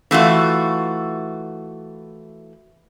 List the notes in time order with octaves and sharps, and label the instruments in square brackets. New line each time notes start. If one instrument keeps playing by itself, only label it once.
[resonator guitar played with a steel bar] E3 A3 F4 F#4